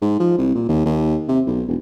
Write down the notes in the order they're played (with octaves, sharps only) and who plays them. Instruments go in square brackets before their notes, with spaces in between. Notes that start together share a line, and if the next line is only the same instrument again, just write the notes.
[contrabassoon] G#2
F3
C2
A#2
D#2
D#2
C3
B1
E1